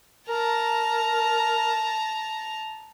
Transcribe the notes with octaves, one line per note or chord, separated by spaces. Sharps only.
A#4 A5 A#5